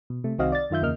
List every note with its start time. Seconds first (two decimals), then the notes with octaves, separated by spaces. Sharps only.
0.10 B2
0.24 C3 A3
0.39 C2 D#3 C4 F#4 D#5 F5
0.52 D5 A6
0.70 F#2 D#3 F4 E5 G6
0.82 E2 C#3 A#3 D#5 F6